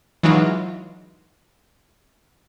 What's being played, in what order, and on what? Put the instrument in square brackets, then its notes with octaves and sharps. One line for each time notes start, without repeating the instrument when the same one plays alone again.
[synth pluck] E3 F#3 G#3 D#4 F4